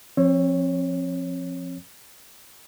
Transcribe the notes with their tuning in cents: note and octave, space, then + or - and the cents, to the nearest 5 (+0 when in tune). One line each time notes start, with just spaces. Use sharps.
F3 +0 C4 +35 C#5 +0